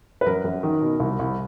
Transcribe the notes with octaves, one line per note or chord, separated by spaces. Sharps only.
B4
F#2 A#4
F#2
D#3
B2
C2
C2